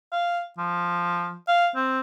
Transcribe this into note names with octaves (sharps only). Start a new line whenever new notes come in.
F5
F3
F5
C4